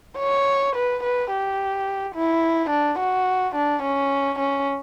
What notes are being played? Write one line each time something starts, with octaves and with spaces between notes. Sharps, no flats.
C#5
B4
B4
G4
E4
D4
F#4
D4
C#4
C#4